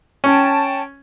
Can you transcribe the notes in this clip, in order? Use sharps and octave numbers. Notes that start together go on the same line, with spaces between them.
C#4 G5 A5